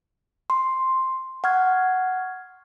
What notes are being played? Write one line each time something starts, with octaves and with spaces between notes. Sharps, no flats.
C6
F#5 C#6 F6 G#6